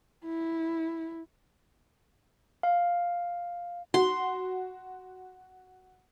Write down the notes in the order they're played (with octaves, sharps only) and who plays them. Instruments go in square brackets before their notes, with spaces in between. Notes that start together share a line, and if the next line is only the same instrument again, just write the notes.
[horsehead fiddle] E4
[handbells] F5
[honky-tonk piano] F#4 [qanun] C6